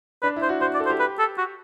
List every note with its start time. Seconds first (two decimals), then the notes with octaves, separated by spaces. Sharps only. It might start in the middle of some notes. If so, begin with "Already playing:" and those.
0.23 D4 B4
0.36 E4
0.42 C5
0.49 F#4
0.61 F#4 C5
0.74 D5
0.80 A4
0.87 C5
0.90 G4
1.00 B4
1.19 A4
1.38 F#4